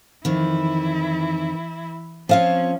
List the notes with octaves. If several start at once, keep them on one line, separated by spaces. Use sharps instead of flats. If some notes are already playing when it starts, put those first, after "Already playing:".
F2 D#3 E3 E4
F3 C4 C#4 F4 C#5 F5